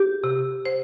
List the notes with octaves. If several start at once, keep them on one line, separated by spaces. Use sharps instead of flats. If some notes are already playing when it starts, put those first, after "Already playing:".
Already playing: G4
C3
C5